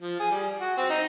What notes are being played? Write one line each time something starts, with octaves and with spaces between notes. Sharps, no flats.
F3
G#4
G3
F#4
C4
D#4